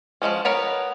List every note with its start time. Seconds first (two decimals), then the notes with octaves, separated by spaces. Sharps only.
0.22 F3 F#3 G#3 C#4
0.45 B3 A#4 C#5 B5